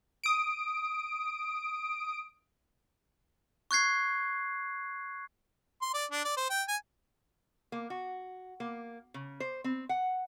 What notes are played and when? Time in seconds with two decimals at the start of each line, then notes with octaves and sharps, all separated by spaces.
0.24 D#6 D7
3.71 C#6 F#6 G#6 C7
5.82 C6
5.94 D5
6.12 D4
6.25 D5
6.37 C5
6.50 G5
6.68 G#5
7.72 A#3
7.90 F#4
8.60 A#3
9.14 C#3
9.40 C5
9.64 C4
9.89 F#5